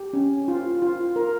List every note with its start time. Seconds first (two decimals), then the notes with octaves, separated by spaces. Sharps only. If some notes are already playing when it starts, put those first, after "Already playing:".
Already playing: G4
0.13 C#4
0.48 F4
0.82 F4
1.16 A#4